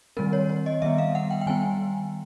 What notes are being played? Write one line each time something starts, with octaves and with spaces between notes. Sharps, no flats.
D#3 G3 C4 A#4
C#5
C#5
D#5
D#3 G3 B3 E5
F5
F#5
G5
G5
D#3 G3 B3 G#5